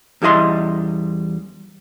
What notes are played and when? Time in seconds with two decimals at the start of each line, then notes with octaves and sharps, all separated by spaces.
0.22 E2 G3 E4 D#5 C6